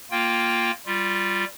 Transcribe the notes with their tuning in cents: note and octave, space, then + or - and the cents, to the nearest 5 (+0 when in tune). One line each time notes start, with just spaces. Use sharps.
A#3 +0 F4 +0 G5 +0
G3 +0 F4 +0